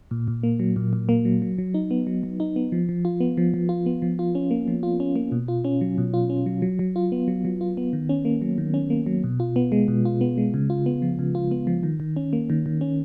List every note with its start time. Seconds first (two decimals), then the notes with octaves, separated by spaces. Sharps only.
0.11 A#2
0.28 A#2
0.43 A#3
0.60 F#3
0.76 A#2
0.93 A#2
1.09 A#3
1.25 F#3
1.42 F#3
1.58 F#3
1.74 D#4
1.91 B3
2.07 F#3
2.23 F#3
2.40 D#4
2.56 B3
2.72 F3
2.89 F3
3.05 F4
3.20 B3
3.37 F3
3.54 F3
3.69 F4
3.86 B3
4.02 F3
4.19 F4
4.35 C#4
4.51 A#3
4.68 F3
4.83 F4
5.00 C#4
5.16 A#3
5.32 B2
5.48 F4
5.65 C#4
5.81 F#3
5.98 B2
6.14 F4
6.30 C#4
6.46 F#3
6.62 F#3
6.79 F#3
6.96 F4
7.12 B3
7.28 F#3
7.45 F#3
7.61 F4
7.77 B3
7.93 D#3
8.09 C#4
8.25 A#3
8.42 F#3
8.58 D#3
8.74 C#4
8.90 A#3
9.06 F#3
9.24 B2
9.40 F4
9.56 B3
9.72 G#3
9.88 B2
10.05 F4
10.21 B3
10.38 G#3
10.54 C#3
10.70 F4
10.86 B3
11.02 F3
11.19 C#3
11.35 F4
11.51 B3
11.67 F3
11.83 D#3
12.00 D#3
12.17 C#4
12.33 A#3
12.50 D#3
12.66 D#3
12.81 C#4